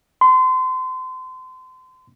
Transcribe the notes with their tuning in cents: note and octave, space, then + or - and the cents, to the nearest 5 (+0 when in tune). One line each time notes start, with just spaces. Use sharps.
C6 -30